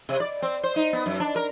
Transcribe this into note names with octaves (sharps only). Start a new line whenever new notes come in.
C3
D5
C4
C5
D#4
B3
F#2
D4
A#4